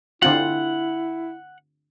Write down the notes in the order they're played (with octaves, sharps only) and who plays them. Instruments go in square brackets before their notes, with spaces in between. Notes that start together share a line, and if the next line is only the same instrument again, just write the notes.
[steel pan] D3 C4 F4 [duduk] E4 [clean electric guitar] F#5